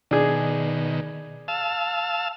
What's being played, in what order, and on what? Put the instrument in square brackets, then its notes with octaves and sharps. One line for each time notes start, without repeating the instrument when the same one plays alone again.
[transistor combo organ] B2 D#3 [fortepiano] D4 G#4
[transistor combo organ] F5 A5 E6